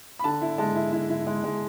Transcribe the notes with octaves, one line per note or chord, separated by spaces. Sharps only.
B5
D3 A5
E4
G#3 A5
E4
E4
E4
G#3
G#3